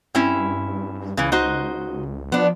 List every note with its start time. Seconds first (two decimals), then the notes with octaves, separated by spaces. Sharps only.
0.15 G2 C4 C#4 E4
1.17 C#2 C#3 E3
1.32 D#4 F#4 C5
2.32 F3 B3 D4